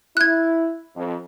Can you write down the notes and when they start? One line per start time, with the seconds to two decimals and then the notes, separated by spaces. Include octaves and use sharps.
0.17 E4 F#6 G#6
0.96 F2